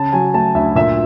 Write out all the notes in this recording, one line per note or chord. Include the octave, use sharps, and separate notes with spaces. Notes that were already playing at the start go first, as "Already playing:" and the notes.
Already playing: C#3 A5
F#3 G#5
A3 A5
D2 E5
A#2 E5